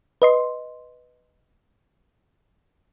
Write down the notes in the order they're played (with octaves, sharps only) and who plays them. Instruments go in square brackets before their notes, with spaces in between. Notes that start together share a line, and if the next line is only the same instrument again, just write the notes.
[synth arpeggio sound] B4 D#5 C6